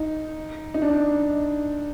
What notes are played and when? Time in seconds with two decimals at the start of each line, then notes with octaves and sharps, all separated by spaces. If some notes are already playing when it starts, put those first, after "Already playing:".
Already playing: D#4
0.74 D#4
0.82 D4
0.89 D#4